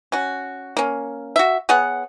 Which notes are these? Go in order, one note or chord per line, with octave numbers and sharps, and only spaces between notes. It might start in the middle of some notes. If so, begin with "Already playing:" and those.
C#4 F#4
A#3 C#4
F#4 E5
B3 G#4 C#5 F#5